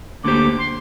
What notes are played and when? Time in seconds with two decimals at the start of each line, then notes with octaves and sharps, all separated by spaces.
0.24 D2 D3 A#3 G4 C5 D6
0.58 C6